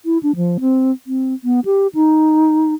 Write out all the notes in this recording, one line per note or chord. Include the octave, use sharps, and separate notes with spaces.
E4
D4
F3
C4
C4
B3
G4
D#4